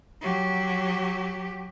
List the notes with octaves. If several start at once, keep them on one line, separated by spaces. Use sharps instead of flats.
F#3 G4